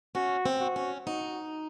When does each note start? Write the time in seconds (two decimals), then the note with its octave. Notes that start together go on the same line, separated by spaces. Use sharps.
0.15 C#4 F#4
0.46 C4
0.60 F#4
0.76 C#4
1.06 D#4 F#4